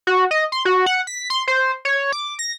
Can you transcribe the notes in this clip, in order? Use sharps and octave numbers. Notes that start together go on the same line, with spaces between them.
F#4
D#5
C6
F#4
F#5
B6
C6
C5
C#5
D6
A#6